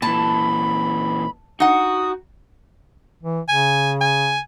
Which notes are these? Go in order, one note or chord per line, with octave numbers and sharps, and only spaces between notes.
A#2 E3 A5 B5
D#4 F#4 F#5 D#6
E3
C#3 G#5
G#5